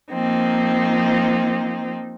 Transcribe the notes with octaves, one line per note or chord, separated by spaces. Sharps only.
F3 A#3 C4 D#4